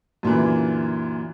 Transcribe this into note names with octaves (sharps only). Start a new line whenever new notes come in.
F#2 A#2 D3 E3